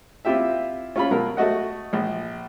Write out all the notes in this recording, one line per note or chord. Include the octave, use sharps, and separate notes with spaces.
C4 E4 F4 G4 E5
C#4 F4 B5
B2 F#3 A#4
A3 F#4 D#5 F#5
A#1